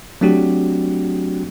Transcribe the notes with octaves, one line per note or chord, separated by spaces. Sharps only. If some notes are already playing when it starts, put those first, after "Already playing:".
F#3 A3 C4 D4 F#4 G4